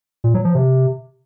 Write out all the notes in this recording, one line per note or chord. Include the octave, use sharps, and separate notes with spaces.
A#2
F#3
F3
C3